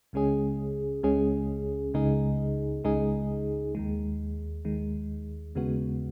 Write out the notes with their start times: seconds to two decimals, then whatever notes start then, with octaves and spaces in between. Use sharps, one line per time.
0.13 C#2 C#3 G#3 C#4 G#4
1.03 C#2 C#3 G#3 C#4 G#4
1.94 C#2 C#3 G#3 D#4 G#4
2.84 C#2 C#3 G#3 D#4 G#4
3.75 D#2 D#3 G#3
4.65 D#2 D#3 G#3
5.55 D#2 C#3 G#3 B3 F#4